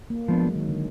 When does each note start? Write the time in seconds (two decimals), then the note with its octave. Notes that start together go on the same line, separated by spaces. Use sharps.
0.10 A#3
0.28 F3 G#3 B3 D4
0.43 F#3
0.56 D#3
0.69 D3